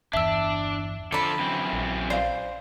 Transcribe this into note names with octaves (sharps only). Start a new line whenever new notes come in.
G1 E2 D4 E5 E6
D3 F3 A4 D5 B5
F#2 E3 C4
A#1
C5 D5 F5